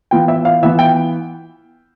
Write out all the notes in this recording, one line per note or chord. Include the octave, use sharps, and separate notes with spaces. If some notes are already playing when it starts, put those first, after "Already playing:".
E3 B3 F4 G5
E5
F5
E3 B3 F4 E5
G5